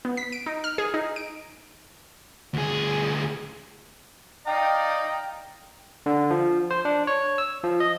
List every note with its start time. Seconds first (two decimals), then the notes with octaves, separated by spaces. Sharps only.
0.05 B3
0.17 B6
0.32 D7
0.46 D#4
0.64 F6
0.78 G#4
0.94 D#4
1.16 D7
2.54 D2 G#4
4.47 D5 D#5 F5 G5 A#5
6.06 D3
6.30 F3
6.71 C5
6.85 D4
7.07 C#5
7.38 E6
7.64 F3
7.80 D#5